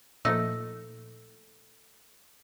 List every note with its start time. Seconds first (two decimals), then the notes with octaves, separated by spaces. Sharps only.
0.25 A#2 F3 A3 D#4 E6